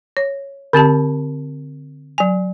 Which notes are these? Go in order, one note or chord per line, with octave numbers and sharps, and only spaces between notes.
C#5
D3 C4 G4 A5
F#3 G#5